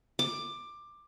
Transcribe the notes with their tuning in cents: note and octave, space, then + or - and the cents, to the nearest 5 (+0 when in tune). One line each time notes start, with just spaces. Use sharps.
D6 +15